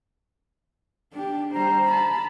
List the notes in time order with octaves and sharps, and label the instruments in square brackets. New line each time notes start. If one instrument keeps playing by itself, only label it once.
[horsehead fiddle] D4 G4
[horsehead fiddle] G3 C5 [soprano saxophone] A#5
[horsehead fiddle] A5 B5